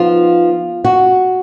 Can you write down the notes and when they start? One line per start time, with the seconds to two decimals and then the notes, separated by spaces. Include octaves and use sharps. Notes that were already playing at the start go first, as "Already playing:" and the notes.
Already playing: F3 B3 D#4 F4
0.85 F#4